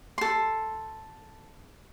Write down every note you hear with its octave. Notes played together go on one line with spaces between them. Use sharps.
A4 C6